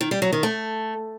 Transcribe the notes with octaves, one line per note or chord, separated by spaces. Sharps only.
D#3
G3
F#3
D#3
A3